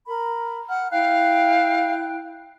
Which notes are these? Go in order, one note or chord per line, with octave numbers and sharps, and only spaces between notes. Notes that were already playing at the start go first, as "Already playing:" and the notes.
A#4 B5
F#5 F6
E4 F5 G5 F#6